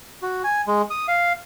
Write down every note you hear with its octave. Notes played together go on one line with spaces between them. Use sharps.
F#4
G#5
G#3
D#6
F5